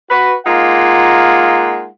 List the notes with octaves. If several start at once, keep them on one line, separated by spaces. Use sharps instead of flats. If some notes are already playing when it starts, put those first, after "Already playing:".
F#4 B4
G#3 A#3 D#4 F4 F#5